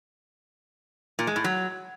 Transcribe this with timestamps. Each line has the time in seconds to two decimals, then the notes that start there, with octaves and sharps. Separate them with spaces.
1.19 A#2
1.27 G#3
1.36 A2
1.44 F#3